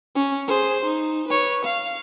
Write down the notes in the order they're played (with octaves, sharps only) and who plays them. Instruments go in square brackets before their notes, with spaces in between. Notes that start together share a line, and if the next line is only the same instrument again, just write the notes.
[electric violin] C#4
G#4 C5
D#4
B4 C#5
F5